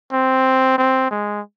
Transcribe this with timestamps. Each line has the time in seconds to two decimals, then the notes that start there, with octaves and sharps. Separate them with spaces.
0.12 C4
0.78 C4
1.11 G#3